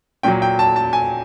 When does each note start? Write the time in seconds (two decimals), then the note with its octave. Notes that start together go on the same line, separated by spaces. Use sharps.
0.23 A#2 F#3 G5
0.42 G5
0.59 A5
0.76 A5
0.93 G#5